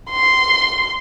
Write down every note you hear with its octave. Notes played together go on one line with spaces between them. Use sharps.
C6